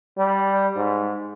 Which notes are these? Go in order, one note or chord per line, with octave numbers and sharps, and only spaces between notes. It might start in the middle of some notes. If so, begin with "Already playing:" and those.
G3
G#2